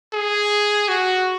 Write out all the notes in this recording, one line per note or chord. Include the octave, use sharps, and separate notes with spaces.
G#4
F#4